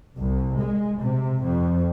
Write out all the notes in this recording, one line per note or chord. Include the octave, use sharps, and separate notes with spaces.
C2
G#3
C3
F2